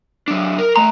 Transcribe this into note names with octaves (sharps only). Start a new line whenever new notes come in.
F#3 D4
A#4
A3 A#5 C6